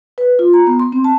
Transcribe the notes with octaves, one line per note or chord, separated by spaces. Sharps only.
B4
F4
A#5
B3
C6
C4
A5